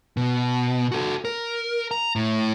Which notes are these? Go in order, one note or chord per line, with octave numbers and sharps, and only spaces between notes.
B2
F#4 A4
A#4
A#5
A2